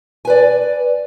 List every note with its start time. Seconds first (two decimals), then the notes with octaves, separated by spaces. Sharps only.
0.25 G#5
0.27 B4
0.30 D5